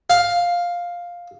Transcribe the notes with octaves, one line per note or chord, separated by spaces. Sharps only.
F5